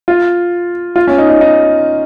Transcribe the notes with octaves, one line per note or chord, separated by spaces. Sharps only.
F4
F4
C#4
D#4
D#4
D#4